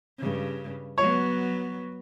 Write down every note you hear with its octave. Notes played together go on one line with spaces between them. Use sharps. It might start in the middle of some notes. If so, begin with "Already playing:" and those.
G2 C#3
F#3 B3 C#5